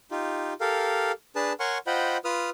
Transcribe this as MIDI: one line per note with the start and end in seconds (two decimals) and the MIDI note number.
0.11 0.53 63
0.11 0.53 65
0.11 0.53 67
0.61 1.12 67
0.61 1.12 69
0.61 1.12 70
0.61 1.12 77
1.36 1.53 62
1.36 1.53 68
1.36 1.53 71
1.36 1.53 81
1.60 1.78 70
1.60 1.78 73
1.60 1.78 78
1.60 1.78 80
1.60 1.78 84
1.60 1.78 85
1.87 2.17 65
1.87 2.17 72
1.87 2.17 75
1.87 2.17 78
1.87 2.17 79
1.87 2.17 83
2.25 2.50 65
2.25 2.50 71
2.25 2.50 87
2.25 2.50 89